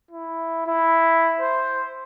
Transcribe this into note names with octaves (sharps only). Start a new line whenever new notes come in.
E4
E4
C5